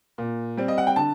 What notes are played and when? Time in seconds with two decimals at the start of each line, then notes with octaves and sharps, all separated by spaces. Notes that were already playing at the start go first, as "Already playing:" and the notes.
0.18 A#2
0.57 G3 C4
0.68 D#5
0.78 F#5
0.87 G5
0.96 D3 A5